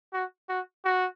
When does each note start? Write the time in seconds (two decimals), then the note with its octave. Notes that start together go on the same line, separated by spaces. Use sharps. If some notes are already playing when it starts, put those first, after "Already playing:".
0.13 F#4
0.49 F#4
0.85 F#4